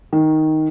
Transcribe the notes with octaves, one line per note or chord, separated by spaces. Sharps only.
D#3